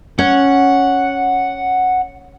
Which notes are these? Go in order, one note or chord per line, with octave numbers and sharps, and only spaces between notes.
C#4 F#5